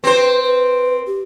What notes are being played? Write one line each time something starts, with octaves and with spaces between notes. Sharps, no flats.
C4 B4 C5
B4
G4